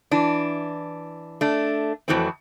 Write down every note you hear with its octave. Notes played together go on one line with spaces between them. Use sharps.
E3 D4
A3 D4
F2 E3 F#3 A3 C4